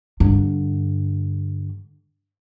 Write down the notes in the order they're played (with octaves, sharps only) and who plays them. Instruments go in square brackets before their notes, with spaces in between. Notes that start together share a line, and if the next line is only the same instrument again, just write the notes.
[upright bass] G2 D3